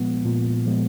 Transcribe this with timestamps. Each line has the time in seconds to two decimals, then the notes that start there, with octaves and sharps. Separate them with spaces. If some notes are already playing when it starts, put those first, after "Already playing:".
Already playing: A#2 F3 G#3 B3
0.25 A#2
0.66 F3 G#3 B3